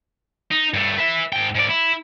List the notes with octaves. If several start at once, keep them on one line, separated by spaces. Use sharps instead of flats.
D#4
G2 A3
B4 E5
G#2 G5
G#2 D5
E4